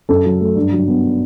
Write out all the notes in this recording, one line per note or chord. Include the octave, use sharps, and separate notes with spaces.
F#2 A4
F#3
A3
G2
F#3
B3